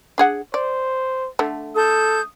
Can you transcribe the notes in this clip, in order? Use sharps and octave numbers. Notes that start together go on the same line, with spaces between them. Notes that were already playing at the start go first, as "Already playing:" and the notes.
D4 G#4 F#5
C5 D5
D3 A3
A4 D#6 G6